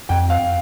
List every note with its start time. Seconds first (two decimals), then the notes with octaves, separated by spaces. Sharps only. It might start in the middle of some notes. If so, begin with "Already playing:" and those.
0.09 F2 G5
0.30 F5